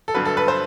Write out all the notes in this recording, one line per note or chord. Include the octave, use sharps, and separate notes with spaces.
A4
G1 G2 F#3 B4
A4
B4
C5